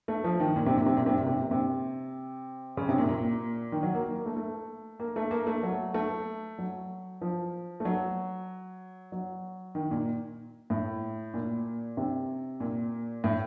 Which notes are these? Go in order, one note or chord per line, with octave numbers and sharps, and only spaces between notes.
A3
F3
D#3
A#2
C3
A#2
C3
A#2
C3
A#2
C3
A#2
C3
C#3
C3
A#2
A#2
D#3
F#3
A#3
A#3
A#3
A3
A3
A#3
A3
A#3
A3
F#3
A3
F#3
F3
A3
F#3
F#3
D#3
A#2
A2
A#2
C3
A#2
A2